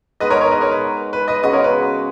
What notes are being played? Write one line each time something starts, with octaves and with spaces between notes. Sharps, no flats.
G#3 B3 D#4 B4 D#5
A#4 C#5
A#4 C#5
B4 D#5
A#4 C#5
B4
B4
B4 D#5
C#3 G#3 B3 F#4 B4 D#5
A#4 C#5
B4